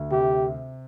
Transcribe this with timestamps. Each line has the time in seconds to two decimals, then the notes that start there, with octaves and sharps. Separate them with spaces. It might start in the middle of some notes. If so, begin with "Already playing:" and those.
Already playing: D2
0.11 C3 G4